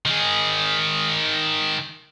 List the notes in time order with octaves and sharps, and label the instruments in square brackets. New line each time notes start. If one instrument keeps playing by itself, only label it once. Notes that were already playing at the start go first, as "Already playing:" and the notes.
[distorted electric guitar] D#3 G#4